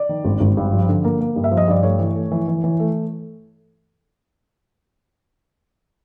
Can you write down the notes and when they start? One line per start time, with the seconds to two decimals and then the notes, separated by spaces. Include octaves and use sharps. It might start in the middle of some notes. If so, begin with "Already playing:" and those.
Already playing: D5
0.09 D#3
0.25 G#1
0.40 G#1
0.57 G2
0.72 F3
0.89 D3
1.04 A#3
1.21 A#3
1.36 G2
1.44 E5
1.51 F3
1.57 D#5
1.68 G2 D5
1.83 A3 C#5
1.99 E3
2.15 A3
2.32 E3
2.48 E3
2.64 E3
2.80 A3